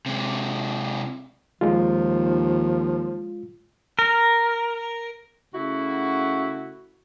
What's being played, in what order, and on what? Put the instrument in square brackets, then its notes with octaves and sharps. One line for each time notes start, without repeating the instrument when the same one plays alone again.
[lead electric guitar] C3 G#3
[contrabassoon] D#2 [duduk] F3 [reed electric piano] G#3 F4
[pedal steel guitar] A#4
[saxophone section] C#3 A3 E4 F#4